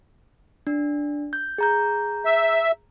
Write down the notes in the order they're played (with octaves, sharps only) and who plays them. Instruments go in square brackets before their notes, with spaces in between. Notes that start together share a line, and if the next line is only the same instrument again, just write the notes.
[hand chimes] D4
G6
G#4 A#5 G6
[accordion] E5